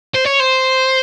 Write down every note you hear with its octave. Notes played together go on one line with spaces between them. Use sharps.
C5
C#5
C5